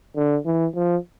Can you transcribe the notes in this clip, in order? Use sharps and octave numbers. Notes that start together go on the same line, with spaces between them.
D3
E3
F3